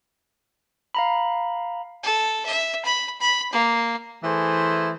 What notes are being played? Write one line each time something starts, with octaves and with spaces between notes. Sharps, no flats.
F5 A#5 B5
A4
E5
B5
B5
A#3
E3 A3 G#4 C5